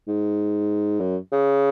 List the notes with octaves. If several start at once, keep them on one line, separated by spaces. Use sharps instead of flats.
G#2
F#2
C#3